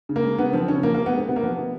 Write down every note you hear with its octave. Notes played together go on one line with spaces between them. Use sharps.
C#3
A#3
G#3
C#3 B3
F3 C4
C#3 C#4
F3 A#3
C3 A#3
B3
G#3 C4
C3 B3
A#3
F3 B3
C3